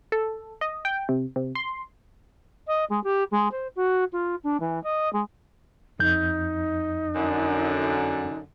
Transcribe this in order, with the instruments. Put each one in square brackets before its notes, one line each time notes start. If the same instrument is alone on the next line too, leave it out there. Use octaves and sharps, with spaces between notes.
[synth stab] A4
D#5
G5
C3
C3
C6
[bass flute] D#5
G#3
G4
G#3
C5
F#4
F4
D4
E3
D#5
G#3
[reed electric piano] F2 G6 [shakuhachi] D#4
[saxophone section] F#2 D3